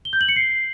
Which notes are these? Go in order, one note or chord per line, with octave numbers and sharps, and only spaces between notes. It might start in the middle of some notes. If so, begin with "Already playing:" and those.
G7
G6
F#7
C#7
C7